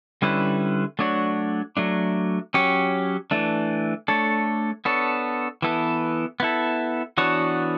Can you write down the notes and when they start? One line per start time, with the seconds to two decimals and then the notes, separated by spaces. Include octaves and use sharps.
0.22 D3 G3 C#4 E4 B4
0.99 F#3 A3 D4 F#4 C#5
1.77 F#3 A3 D4
2.54 F#3 C#4 G4 C#5
3.31 E3 A3 D4
4.08 A3 D4 A4 C#5
4.85 B3 D4 A4 C#5
5.62 E3 B3 E4 A4
6.40 B3 E4 A4
7.18 E3 B3 D4 F#4 C#5